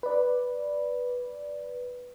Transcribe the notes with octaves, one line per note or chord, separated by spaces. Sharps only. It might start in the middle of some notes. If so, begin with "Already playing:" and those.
B4 D5